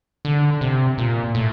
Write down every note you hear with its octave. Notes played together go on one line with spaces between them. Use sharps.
D3
C3
A#2
A2